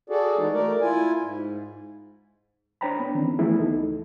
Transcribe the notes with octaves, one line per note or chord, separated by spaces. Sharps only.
F#4 G#4 A4 D5
E3 G#3 D#4
A3 A#4 D5
E4 F4 G#5
G#2
D4 C5 C#5 G5 A#5 B5
B3 D4
D#3 E3 C4 C#4
E3 F3 A3 B3 E4 G#4
C#2 D#4 A4